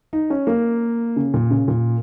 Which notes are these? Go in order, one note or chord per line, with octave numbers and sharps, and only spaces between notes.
D#4
C#4
A#3
C#3
A#2
C#3
A#2